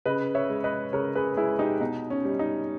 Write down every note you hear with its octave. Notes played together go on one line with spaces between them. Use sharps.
C#3 B4 D#5
C#5 E5
G#3
B4 D#5
C#3 A#4 C#5
G#4 B4
G#3 E4 G#4
D#4 G4
B2 D#4
C#4
G3
D#4